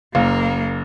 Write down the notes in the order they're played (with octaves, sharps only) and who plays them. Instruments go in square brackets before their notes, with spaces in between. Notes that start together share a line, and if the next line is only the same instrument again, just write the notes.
[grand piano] F#1 [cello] A#3 [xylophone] F5